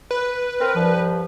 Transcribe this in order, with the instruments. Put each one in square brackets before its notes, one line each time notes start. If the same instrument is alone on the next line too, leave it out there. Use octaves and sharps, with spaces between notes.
[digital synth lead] B4
[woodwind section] C4 A#4
C2 G2 F3